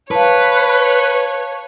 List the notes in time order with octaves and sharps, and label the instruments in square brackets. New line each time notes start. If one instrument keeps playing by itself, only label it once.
[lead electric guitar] B4 [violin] C#5 [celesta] F5 A5